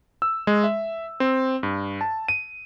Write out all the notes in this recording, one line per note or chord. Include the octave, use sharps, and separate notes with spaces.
E6
G#3
E5
C4
G2
A5
D#7